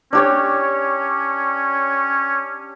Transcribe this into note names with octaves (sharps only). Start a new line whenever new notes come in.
C#4 D4 G4 C#5